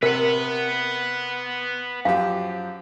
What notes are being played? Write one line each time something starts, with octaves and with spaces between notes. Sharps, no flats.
C3 A#4 B4 F#5
F#2 F3 G4 F5